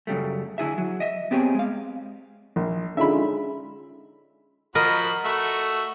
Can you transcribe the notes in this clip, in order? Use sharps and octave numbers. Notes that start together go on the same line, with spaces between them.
F#2 C#3 G3 A3
D3 E4 G#4 E5
F#3
D#5 E5
B3 C4 G4 G#4 C#5
G#3 F5
A#1
D3 G#3 C#4 D#4 F4 E5 B5
F3 F#4 A#4 D#5 B5
A3 F#4 E5